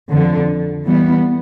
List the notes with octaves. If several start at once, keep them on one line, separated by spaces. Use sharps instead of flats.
F2 D3 F3
E3 G3 B3